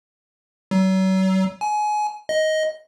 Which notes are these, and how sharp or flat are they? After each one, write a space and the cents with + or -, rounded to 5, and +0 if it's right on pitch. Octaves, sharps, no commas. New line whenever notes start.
F#3 +40
G#5 +25
D#5 +10